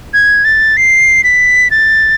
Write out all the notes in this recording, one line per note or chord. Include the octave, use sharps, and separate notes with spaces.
G#6
A6
C7
B6
A6